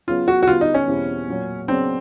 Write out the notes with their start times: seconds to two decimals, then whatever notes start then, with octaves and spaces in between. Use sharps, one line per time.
0.07 C#3 F#3 B3 F4
0.28 F#4
0.43 F#4
0.47 D3 G3 B3 F4
0.61 D#4
0.74 C#4
0.88 E2 B2 G3 C4 E4
1.28 A#2 F#3 A#3
1.68 C#3 F#3 B3 C4 D4